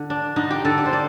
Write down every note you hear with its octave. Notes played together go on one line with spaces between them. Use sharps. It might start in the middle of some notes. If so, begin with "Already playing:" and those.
Already playing: D3
D4
D3 D#4
G4
D3 A4
D5
C5
A#3 D5